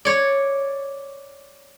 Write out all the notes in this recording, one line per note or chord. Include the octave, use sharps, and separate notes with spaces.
C#5 D5